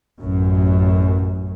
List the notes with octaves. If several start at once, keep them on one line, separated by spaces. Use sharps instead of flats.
A1 F#2